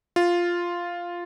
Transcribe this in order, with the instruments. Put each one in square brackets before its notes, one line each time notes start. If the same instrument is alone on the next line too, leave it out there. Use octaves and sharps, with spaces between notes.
[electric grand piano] F4